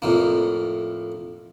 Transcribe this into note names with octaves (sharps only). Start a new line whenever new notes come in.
F2 A2 A#3